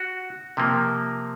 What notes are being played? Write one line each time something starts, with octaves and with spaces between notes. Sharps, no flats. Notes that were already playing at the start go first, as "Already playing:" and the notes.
Already playing: F#4
C3 F3 A#3